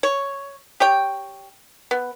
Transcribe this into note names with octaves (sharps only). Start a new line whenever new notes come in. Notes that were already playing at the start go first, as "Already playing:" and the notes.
C#5
G4 C#5 G5
B3